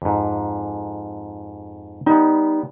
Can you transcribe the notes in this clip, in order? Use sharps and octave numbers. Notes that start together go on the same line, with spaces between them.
F2 G#2
G3 B3 D#4